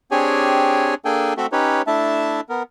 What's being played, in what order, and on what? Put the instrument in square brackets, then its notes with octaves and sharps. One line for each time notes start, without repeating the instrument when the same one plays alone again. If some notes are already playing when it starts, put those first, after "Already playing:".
[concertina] C4 D4 G4 G#4 C#5 G#5
A#3 D4 G#4 A4 G5 G#5
A3 C4 F#4 A4 E5
C#4 D#4 G4 B4 C#5
A3 D4 E4 E5 A5
B3 A#4